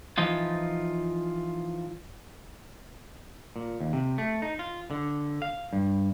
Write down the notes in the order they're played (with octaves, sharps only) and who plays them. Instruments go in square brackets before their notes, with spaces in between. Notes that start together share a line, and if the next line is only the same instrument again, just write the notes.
[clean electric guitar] E3 F3 D#4 F4
A#2
D#2
C3
A3
D#4
F4
D3
F5
G2